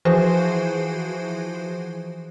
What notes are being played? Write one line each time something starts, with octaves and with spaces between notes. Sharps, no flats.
E3 F3 F#4 G#4 C5